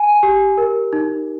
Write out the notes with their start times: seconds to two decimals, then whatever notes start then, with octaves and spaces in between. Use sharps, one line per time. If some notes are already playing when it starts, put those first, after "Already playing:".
Already playing: G#5
0.23 G4
0.58 A#4
0.93 D#4